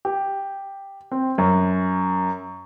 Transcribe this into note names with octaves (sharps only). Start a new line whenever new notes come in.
G4
C4
F#2